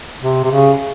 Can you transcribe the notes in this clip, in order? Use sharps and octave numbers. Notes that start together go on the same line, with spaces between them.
C3
C3
C#3